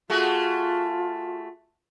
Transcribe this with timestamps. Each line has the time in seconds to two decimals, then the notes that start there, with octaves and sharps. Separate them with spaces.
0.10 A3 F4 F#4 G#4